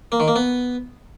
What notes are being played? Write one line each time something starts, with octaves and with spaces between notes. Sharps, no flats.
A#3
D#3
A#3
B3